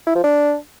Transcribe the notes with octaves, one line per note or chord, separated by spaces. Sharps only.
E4
F3
D4